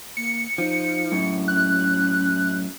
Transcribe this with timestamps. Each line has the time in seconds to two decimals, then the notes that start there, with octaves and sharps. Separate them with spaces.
0.17 A#3 C#7
0.58 F3 D#4
1.12 F#2 A2
1.48 C#4 F#6